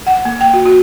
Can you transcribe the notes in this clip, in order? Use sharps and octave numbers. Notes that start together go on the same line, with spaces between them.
F#5
A#3
G5
F#4
F#4